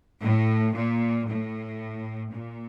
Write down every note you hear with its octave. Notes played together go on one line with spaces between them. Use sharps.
A2
A#2
A2
A#2